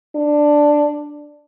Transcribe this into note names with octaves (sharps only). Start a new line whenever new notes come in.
D4